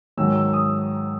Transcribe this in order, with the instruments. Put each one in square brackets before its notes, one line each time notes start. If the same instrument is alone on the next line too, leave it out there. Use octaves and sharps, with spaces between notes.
[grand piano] G#2 D#3 F#3 E6
E6
D#6